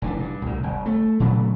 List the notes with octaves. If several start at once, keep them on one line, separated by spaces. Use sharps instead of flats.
F1 E3 D4
G2
C2 A2
G1
A3
A#2 C#3 F#3 A3